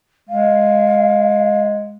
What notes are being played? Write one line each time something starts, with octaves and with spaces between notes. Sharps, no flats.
G#3 F5